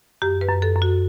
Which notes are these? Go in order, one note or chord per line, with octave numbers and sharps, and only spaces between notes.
F#2 G4
B4
F#2
A4
F#2
F#4